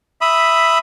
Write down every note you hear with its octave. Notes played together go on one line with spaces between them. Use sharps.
E5 B5 D#6